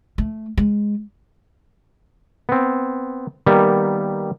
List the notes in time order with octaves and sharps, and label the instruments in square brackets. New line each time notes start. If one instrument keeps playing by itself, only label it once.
[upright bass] A3
G#3
[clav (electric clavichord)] B3 C4
D#3 G3 A#3 B3